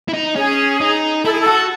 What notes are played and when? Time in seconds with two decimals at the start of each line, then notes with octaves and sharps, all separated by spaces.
0.08 E4
0.14 D#4
0.36 C#4 G#4
0.81 D#4
1.25 E4 A4
1.32 G#4
1.41 A4
1.46 F#4